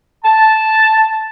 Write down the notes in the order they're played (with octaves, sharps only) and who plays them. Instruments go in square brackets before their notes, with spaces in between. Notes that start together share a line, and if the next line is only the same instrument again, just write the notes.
[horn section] A5